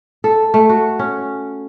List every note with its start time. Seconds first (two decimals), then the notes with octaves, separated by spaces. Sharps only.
0.24 A4
0.54 A3
0.69 F#4
0.99 C#4